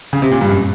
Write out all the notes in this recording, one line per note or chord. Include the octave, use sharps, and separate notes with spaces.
C#3
C3
A#2
G2
F#2